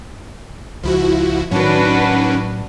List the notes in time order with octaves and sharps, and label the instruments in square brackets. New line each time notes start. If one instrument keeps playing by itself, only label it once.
[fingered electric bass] C#2 [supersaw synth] F3 E4 F#4
[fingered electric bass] A2 F#3 [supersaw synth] D#3 C#4 [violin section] D4 F#4 B4